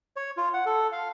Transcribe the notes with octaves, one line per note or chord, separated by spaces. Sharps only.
C#5
F4
F#5
A4
F5